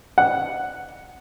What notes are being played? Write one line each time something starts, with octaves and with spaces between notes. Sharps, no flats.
F#5